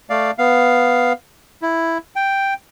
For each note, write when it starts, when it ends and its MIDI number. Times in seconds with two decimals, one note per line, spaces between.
0.10 0.31 57
0.10 0.31 74
0.10 0.31 77
0.38 1.13 59
0.38 1.13 77
1.62 1.98 64
2.16 2.54 79